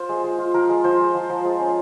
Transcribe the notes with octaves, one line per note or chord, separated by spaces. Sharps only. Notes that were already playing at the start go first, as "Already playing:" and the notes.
Already playing: F4 C5
G#3
G#3
F4
F3 A#4
G#3
F3 C5
G#3
F3
F3
G#3
C#4